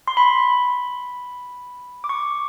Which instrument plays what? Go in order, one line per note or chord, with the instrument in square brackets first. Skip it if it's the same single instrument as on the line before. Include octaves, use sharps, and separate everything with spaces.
[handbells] C6
B5
D6
C#6